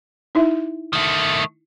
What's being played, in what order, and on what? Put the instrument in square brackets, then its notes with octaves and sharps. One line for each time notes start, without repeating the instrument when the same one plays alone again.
[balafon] D#4 E4 E5
[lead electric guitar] D#3 A3